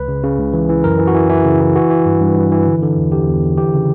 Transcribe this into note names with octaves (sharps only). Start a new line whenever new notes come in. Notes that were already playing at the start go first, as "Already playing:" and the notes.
Already playing: C#2 B4
C#3
C#3
C#2
E3
E3
F#2 A#4
E3
F#4
E3
E3 E4
C#3
E3
E3 F#4
E3
G2
G2
G2
E3
D3
D3
E2
D3 G4
E2
D3
E3 G4
C#3